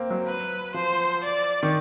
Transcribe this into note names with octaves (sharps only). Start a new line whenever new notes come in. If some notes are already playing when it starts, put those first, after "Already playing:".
Already playing: A#3 C4
F#3
B4
F3 C5
D5
D#3